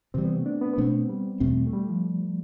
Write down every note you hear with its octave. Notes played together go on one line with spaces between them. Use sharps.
C3 E3 G3 C4
B3
A3
D4
B3
B3
B2 A3 C4 D4
B3
G3
E2 B2 A3 C4
A3
G3
F3